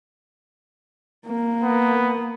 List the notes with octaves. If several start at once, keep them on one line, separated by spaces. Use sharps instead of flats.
A#3
B3